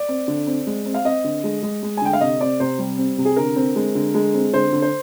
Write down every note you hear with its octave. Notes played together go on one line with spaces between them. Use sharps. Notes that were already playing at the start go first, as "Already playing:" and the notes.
Already playing: D5
C4
D3
C4
G#3
C4
F5
C4 D#5
D3
G#3
G#3
G#3
G#5
D3 G5
F5
C3 D#5
C4 D5
C3 C5
G3
C4
C3
G#4
D3 A#4
C4
G#3
D3
G#3
C4
D3 C5
D3
C5